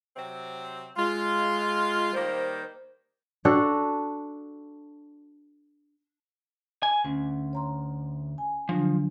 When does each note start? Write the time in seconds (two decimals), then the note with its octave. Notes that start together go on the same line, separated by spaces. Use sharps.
0.16 C3 F#3 C4
0.96 G#3 F4
2.14 D#3 G3 A#3 C5
3.45 D4 F#4 A4
6.83 G#5
7.04 D2 C#4
7.53 C#5 A#5 C6
8.38 G#5
8.69 D3 F3 F#3 D4